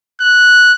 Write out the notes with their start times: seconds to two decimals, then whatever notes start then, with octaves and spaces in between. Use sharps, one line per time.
0.21 F#6